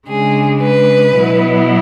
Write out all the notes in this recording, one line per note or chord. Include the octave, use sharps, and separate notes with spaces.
C#3 G#3 D4 G#4
B4
B2 F#3 B3 E4